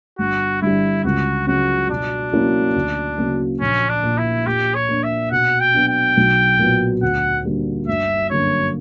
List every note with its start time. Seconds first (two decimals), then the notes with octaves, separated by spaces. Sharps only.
0.19 G1 F#4
0.62 G2 D3 G3 E4
1.04 C#2 F#4
1.47 C#3 F#3 F#4
1.90 B2 D4
2.32 F#3 A#3 C#4 E4
2.76 D2
3.17 C#3 F#3 A#3
3.61 A#1 C#4
3.89 D4
4.03 A#2 A#3
4.18 E4
4.46 A#2 G4
4.75 C#5
4.89 A#3 D4
5.03 E5
5.31 B2 F#5
5.60 G5
5.74 F#3 B3 D4
5.88 G5
6.17 B1
6.59 A#2 F#3 B3
7.02 D2 F#5
7.45 D3 G3 A#3
7.88 G1 E5
8.30 F#2 D3 A#3 C#5